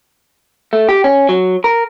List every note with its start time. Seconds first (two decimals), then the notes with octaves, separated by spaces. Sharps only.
0.73 A3
0.89 G4
1.04 C#4
1.29 F#3
1.64 A#4